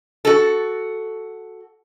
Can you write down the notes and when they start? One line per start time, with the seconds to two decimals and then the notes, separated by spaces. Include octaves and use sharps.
0.25 F#4 A4